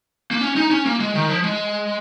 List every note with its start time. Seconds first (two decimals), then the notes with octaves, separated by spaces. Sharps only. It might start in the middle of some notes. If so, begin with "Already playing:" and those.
0.31 A#3
0.41 C#4
0.56 D#4
0.71 C#4
0.86 A#3
1.00 G#3
1.15 D#3
1.29 F3
1.44 G#3